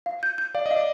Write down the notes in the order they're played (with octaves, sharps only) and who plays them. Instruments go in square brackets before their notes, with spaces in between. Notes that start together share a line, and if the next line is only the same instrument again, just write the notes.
[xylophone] F5
G6
G6
[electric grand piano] D5 [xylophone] F5
[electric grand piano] D#5
[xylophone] F5
[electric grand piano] D5